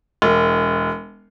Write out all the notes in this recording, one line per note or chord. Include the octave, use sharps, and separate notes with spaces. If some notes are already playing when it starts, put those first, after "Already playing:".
E1